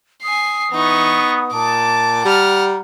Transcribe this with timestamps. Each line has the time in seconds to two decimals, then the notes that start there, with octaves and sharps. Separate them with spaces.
0.24 G#5 D#6 C7
0.72 E3 B3 D#4 C#6
1.53 A#2 A5 D6
2.25 G3 F#5 A#5 F6